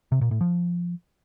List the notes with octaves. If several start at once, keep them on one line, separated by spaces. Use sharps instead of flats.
C3
A#2
A2
F3